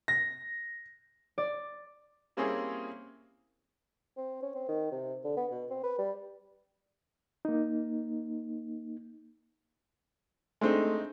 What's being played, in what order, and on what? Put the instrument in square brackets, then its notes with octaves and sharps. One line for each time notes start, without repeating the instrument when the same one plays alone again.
[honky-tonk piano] A#6
[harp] D5
[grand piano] G3 A#3 C4 C#4 E4 G#4
[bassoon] C4
C#4
C4
D#3
C3
D3
B3
B2
C4
B4
G3
[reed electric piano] A#3 D#4
[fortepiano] G#3 C4 D#4 [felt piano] A3 D4